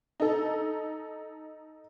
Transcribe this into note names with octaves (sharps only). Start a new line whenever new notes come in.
D#4 A4